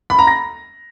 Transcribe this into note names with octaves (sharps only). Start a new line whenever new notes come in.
B5
A#5
A#6